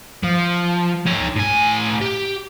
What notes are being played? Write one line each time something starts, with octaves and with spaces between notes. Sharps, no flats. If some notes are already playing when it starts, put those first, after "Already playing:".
F3
D#4 C#5
A2 G#5
G4